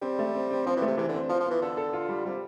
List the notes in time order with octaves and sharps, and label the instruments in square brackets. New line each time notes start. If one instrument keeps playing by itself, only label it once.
[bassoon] G3 [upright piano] C4
[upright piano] A3
C4
C4
[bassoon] F3 [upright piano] C4
[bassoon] E3 [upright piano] A3
[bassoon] C3
[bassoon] C3 [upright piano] E3
[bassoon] D3
[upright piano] C4
[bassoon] F3 [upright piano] F4
[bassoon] F3
[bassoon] E3 [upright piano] B3
[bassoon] D3 [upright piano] A4
[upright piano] A4
F4
G3
[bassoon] C3 [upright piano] G3